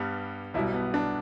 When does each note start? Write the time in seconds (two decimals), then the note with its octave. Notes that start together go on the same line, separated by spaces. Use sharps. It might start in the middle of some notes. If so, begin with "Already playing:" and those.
Already playing: G2 G3 B3
0.54 B1 B2 G3 E4
0.74 B3
0.94 D4